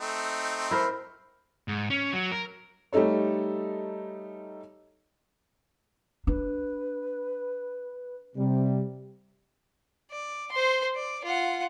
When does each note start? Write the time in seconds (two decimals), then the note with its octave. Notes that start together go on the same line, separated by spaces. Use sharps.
0.01 A3 C4 D#4
0.71 E4 A#4 C5
1.68 G#2
1.90 C#4
2.13 F#3
2.32 A#4
2.93 G3 A3 D#4 A4 C#5
6.27 D4 B4
8.36 C3 G3
10.11 D5
10.52 C5 C6
10.96 D5
11.24 F4 F#5